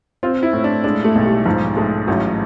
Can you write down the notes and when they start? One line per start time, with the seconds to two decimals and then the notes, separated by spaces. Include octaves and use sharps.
0.23 C4 F4
0.43 E4
0.53 A2
0.64 D4
0.84 G#3 D4
1.04 A3
1.15 B1
1.25 G3
1.45 G#2 F3
1.77 G#3 A3
2.07 A1 F#3